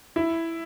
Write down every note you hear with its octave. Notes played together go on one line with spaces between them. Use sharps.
E4